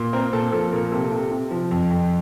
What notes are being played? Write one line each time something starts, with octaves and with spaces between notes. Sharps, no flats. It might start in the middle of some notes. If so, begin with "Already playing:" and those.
Already playing: A#2
C4 A#4
A#2 A4
F3 A4
A#2 A#4
C3 A4
C3
C3
F3
F2
F2